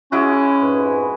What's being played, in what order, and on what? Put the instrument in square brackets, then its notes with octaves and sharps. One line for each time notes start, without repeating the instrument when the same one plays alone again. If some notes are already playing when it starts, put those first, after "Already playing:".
[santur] G#3 E4 F#4 [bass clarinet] C#4
[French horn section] F2 G#2 B4